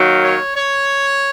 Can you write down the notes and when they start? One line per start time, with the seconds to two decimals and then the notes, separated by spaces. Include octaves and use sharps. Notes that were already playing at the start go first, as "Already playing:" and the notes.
Already playing: D#3 F#3 A#3
0.22 C#5
0.55 C#5